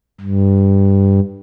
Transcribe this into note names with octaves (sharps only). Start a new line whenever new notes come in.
G2